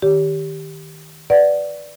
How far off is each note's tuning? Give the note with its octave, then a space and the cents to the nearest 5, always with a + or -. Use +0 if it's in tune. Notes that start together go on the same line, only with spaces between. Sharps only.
D#3 -5 G4 +0 C#5 +40
B4 +0 D5 +0 F#5 +0